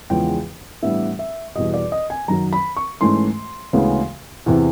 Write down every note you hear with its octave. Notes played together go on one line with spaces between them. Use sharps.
E2 C#3 F3 G#3 B3 G5
A2 E3 G3 B3 D4 E5
E5
E2 B2 G3 D#5
D5
D#5
G#5
F#2 D#3 F#3 A#5
B5
C#6
G#2 E3 A3 C#4 C6
D2 C#3 E3 G#3 B3
E2 C3 E3